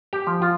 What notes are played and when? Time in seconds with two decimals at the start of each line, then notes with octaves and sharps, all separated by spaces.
0.13 G4
0.27 F3
0.42 F4